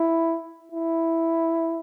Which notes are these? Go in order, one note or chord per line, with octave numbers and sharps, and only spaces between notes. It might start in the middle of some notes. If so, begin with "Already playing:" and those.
Already playing: E4
E4